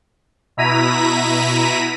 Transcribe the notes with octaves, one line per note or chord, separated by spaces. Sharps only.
B2 E4 A#5 B6 D#7